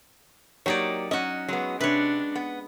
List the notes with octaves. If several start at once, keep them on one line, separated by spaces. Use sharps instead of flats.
F#3 A#3 D#4 G4 C#5 D5
C#4 F#4 D#5
F#3 G#3 B3
C3 D4 B4 C#5
B3